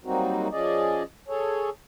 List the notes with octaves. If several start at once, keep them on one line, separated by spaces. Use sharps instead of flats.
F#3 G3 A#3 C4 D#4 F#4
F3 C#4 G#4 D5 D#5
G#4 A4 C#5